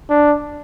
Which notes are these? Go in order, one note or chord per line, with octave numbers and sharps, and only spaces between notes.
D4